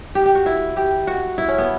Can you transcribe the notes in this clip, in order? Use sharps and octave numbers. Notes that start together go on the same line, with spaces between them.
G4
G4
F#4
E4
G4
F#4
E4
C#4
B3